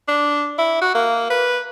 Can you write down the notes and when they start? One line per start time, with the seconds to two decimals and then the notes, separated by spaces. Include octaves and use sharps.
0.08 D4
0.58 E4
0.82 F#4
0.95 A#3
1.30 B4